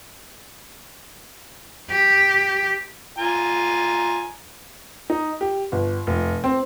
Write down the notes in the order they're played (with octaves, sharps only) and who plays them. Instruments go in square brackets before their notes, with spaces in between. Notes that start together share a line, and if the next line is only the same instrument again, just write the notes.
[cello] G4
[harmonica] F4 G#5 A#5
[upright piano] D#4
G4
G1
F1
C4